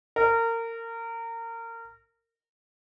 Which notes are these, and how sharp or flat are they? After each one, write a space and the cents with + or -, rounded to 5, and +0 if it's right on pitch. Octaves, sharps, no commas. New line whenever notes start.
A#4 -25